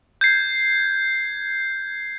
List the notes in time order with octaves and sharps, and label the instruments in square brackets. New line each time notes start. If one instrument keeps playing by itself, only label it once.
[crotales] G6 G#6 C7